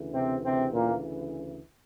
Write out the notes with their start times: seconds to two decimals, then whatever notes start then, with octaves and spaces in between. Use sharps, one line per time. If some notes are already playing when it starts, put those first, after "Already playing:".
Already playing: D2 C#3 E3
0.14 C3 C4
0.44 C3 C4
0.72 A#2 A#3